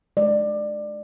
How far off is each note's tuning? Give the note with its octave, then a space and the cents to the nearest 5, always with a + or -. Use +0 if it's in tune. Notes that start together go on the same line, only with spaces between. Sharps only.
G#3 +35 D5 +20